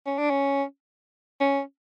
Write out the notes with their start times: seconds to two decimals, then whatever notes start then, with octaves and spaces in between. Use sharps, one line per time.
0.06 C#4
0.18 D4
0.30 C#4
1.40 C#4